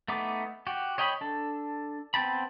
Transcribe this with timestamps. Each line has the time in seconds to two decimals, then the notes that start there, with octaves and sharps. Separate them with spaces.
0.08 A3 B3 D#4 D6
0.67 F#4 G4
0.98 C#5 D#5 G5 A#5 B5
1.21 D4 A4
2.14 B3 C4 G5 A5 B5